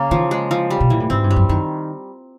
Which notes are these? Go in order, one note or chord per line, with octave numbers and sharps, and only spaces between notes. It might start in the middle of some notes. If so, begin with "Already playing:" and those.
Already playing: C#3 A#3
D#3 F3
G#3
F3
G3
B2
A#2 E3
A2
G#2 C4
G2
G3
F#2
F#2 D#3